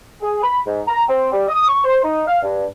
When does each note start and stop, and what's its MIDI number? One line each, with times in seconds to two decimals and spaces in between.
0.22 0.41 68
0.43 0.59 83
0.66 0.81 44
0.87 1.01 82
1.08 1.28 60
1.32 1.44 55
1.48 1.65 87
1.67 1.81 85
1.84 2.01 72
2.03 2.22 63
2.26 2.38 77
2.42 2.66 43